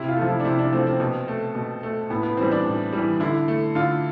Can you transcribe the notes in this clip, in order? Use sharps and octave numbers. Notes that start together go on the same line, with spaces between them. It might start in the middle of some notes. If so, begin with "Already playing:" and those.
Already playing: C3 E4
F4
F3 A3
E4
D4
C3 E4
D4
F3 A3 C4
C4
B2
A3
B2
A3
A2 B3
B3
E3 G3 C4
D4
A2
E3 G3
D3 E4
A3
D3 F4